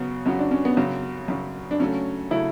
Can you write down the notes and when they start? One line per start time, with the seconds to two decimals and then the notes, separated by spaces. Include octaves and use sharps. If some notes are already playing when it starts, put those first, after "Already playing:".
Already playing: F#2 C#3 F#3 B3
0.26 F#2 C#3 F#3 C#4
0.39 D4
0.51 C#4
0.65 B3
0.77 F#2 C#3 F#3
1.28 F#2 C#3 F#3
1.71 D4
1.79 C#3 F#3 A3 C#4
2.31 C#3 F#3 A3 E4